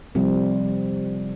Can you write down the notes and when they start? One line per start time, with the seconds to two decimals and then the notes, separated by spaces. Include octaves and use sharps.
0.15 C3 F3 G3 C4